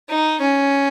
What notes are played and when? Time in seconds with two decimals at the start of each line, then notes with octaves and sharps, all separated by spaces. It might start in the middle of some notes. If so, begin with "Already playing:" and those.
0.09 D#4
0.41 C#4